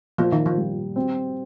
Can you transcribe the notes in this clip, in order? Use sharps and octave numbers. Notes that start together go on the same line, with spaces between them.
A#2 F3
D#3
F3
G3
C4